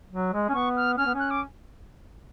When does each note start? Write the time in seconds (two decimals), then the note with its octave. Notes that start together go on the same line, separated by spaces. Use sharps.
0.12 F#3
0.33 G#3
0.49 C#4
0.54 B3 C#6
0.77 F6
0.97 C#4 F6
1.06 B3
1.14 C#4
1.19 F#6
1.31 D6